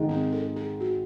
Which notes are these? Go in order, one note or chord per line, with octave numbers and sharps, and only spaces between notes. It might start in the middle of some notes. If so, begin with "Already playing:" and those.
Already playing: G#2 D#3 G#3
C4
A4
G#4
F#4